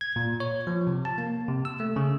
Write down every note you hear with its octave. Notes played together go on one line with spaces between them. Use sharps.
G#6
A#2
C#5
F3
C3
A5
A#3
C3
E6
A3
C#3